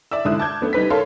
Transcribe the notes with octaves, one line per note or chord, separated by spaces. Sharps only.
D5 E5 E6
G#2 D3 E4 D#6 F#6
A5 D6 G6 G#6
A3 B3 D4
G3 D#4 B4 B6
A4 A#4 C#5 F5 C6